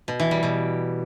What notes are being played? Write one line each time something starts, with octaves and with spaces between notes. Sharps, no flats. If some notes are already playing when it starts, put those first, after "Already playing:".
B2
E3
G3
B2